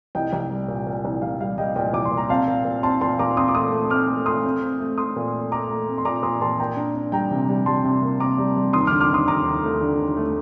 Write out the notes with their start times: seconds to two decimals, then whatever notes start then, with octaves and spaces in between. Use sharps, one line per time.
0.15 C2 D#5 G5
0.33 C2
0.50 G3
0.68 A#2
0.87 A#2
1.05 C2
1.22 C2 F5
1.40 G3 F5
1.58 G3 D#5 G5
1.76 A#2 D#5 G5
1.93 C2 D6
2.05 C6
2.12 A#2
2.17 A#5
2.30 C4 F5 A5
2.47 A#2
2.65 A#2
2.83 C4 A5 C6
3.01 A#2 A5 C6
3.19 A#2 A#5 D6
3.37 C4 C6 D#6
3.48 D6
3.55 A3 C6 D#6
3.72 A3
3.90 C4 D6 F6
4.08 A3
4.26 A3 C6 D#6
4.44 C4
4.62 C4
4.80 A3
4.98 A3 C6 D#6
5.16 A#2
5.33 A3
5.51 A3 A#5 D6
5.69 A3
5.87 C4
5.98 C6
6.05 A#2 A#5 D6
6.23 A#2 C6 D#6
6.41 A#2 A5 C6
6.59 A#3 G5 A#5
6.77 D4
6.95 D4
7.12 G3 G5 A#5
7.31 C3
7.48 G3
7.66 G3 A5 C6
7.84 C3
8.02 A#3
8.20 C3 A#5 D6
8.38 G3
8.56 G3
8.73 D#2 C6 D#6
8.87 D3 D6 F6
9.00 D6 F6
9.10 D#2 C6 D#6
9.27 D#2 A#5 D6
9.45 D#2
9.64 A3
9.81 D3
9.99 D#2
10.17 A3